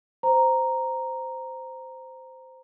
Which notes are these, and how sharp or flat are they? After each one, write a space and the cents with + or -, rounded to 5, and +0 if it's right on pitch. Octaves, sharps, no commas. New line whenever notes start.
C5 -10 A#5 +0